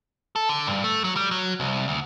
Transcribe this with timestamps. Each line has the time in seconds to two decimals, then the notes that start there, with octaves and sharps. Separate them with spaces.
0.36 A4
0.49 D3
0.67 G2
0.84 A3
1.04 F#3
1.16 G3
1.31 F#3
1.60 C2
1.88 D2